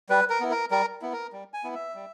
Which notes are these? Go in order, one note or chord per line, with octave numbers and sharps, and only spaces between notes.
G3 B4
A#4
B3 E4
A#4
G3 A#4
B3 E4
A#4
G3
G#5
B3 E4
E5
G3